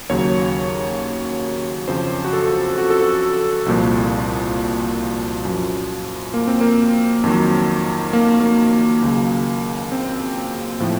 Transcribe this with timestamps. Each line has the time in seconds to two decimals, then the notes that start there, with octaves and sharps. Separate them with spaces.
0.09 D#2 C#3 F#3 C#5
1.88 F2 C#3 F3 C5
2.25 F#4
2.33 A4
2.78 F#4
2.90 A4
3.03 F#4
3.66 C2 A#2 F3
5.45 F#2 F3
6.34 A#3
6.47 C4
6.61 A#3
7.24 F2 D#3 F#3
8.13 A#3
8.40 A#3
9.02 C#2 C#3 F#3
9.92 C4
10.80 A2 F3